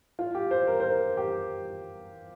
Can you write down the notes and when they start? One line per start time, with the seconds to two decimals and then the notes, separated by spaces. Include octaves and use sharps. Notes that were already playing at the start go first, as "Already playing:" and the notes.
0.19 F4
0.35 G4
0.51 C5
0.67 A#4
0.80 C5
0.83 A#4
1.17 G4